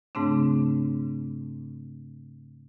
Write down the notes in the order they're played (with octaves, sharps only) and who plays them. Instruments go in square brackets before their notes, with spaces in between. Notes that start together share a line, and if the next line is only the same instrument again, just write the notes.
[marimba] G#2 C#3 A3 C4 D4